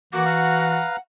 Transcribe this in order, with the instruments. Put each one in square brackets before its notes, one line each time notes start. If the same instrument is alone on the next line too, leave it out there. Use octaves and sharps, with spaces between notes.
[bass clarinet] E3 [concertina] A#3 D6 [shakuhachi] F#4 [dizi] F#5
[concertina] B4 F5 A#5